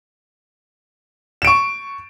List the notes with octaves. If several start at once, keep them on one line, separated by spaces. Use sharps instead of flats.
C#6 D7 E7